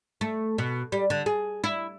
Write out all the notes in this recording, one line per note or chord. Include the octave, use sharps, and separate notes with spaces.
A3
B2
G3
D3
G#4
E4